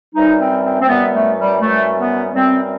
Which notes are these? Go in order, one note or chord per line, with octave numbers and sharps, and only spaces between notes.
F#2 E3 G3 D#4
C4
C4
C4
F#2 E3 G3 B3
A3
G3
F#2 E3 G3 A3
B3
F#2 E3 G3 C4